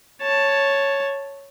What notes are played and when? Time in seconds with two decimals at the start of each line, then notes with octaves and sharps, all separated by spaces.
0.22 C#5 A5